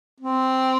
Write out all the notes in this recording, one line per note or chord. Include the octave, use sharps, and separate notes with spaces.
C4